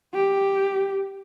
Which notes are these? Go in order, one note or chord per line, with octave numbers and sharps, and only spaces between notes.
G4